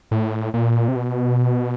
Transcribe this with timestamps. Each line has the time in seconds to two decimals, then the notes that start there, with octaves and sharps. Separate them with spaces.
0.11 A2
0.54 A#2
0.88 C3
0.96 B2